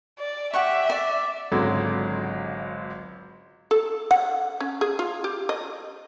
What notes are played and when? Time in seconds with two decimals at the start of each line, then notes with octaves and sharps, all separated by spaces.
0.19 D5
0.53 G4 E5 F#5 C#6
0.90 D5
1.52 G#1 C#2 D3 F#3 G#3
3.71 A4
4.11 F#5
4.60 C#4
4.81 G#4
4.99 F4
5.24 G4
5.49 D#5